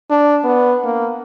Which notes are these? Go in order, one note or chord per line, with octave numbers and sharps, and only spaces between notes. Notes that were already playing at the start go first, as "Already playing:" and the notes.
D4
B3
A#3